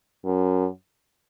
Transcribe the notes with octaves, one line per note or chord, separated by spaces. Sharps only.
F#2